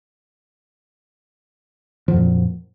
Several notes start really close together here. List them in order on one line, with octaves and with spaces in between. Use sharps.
F3 F#3 F2 A#2